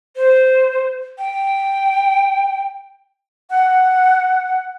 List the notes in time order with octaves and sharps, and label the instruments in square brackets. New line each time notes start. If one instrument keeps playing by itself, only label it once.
[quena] C5
G5
[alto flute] F#5